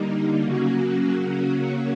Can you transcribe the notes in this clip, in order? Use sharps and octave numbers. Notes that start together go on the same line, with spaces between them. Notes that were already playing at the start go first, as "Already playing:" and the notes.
Already playing: D3 G3 A#3 D#4
C#3 F#3 A#3 C#4 F#4